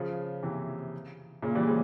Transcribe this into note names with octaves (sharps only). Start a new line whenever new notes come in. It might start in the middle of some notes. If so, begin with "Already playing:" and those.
Already playing: C#3 F3
C3 E3
A#2 C#3
E3 G3
F3 G#3